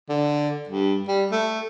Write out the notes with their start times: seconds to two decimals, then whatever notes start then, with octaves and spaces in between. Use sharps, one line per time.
0.09 D3
0.69 G2
1.08 G3
1.32 A3